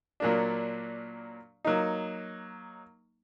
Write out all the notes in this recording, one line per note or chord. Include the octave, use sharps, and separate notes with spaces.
A#2 F#3 A#3 D4
F#3 A#3 D#4